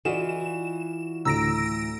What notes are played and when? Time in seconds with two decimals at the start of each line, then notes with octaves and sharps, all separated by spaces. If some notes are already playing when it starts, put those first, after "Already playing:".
0.05 E3 F4 F#4 D5 D#5 E7
1.25 D2 A2 A#5 E6 A#6 D7